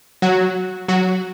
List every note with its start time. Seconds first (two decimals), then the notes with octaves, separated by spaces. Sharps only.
0.22 F#3 F#4
0.88 F#3 F#4